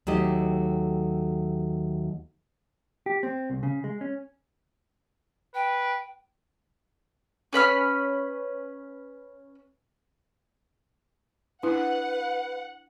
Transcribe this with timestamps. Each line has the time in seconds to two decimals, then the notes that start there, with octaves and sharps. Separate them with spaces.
0.07 D#2 F#3 A3 G4 D#5
3.06 G4
3.23 C4
3.50 C2
3.63 C#3
3.84 G#3
4.01 C#4
5.55 B4 G5
7.53 C#4 B4 B5 F6
11.63 D4 E4 B4 F#5